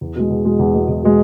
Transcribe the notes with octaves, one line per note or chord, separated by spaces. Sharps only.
E2
B2 G#3
E2
B2 G#3
E2
B2 G#3
E2
B2 G#3